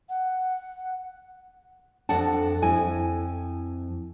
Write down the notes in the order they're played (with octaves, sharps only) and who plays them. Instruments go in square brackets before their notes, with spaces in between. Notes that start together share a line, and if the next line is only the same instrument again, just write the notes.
[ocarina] F#5
[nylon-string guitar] F2 D4 A4 F#5 A5
F2 E4 G#5